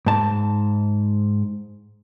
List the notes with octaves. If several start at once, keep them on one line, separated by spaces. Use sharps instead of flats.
G#2 A5